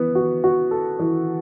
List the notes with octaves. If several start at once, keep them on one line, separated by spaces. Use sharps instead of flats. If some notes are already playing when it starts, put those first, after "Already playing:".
Already playing: E3 B3
F#4
F#4
A4
E3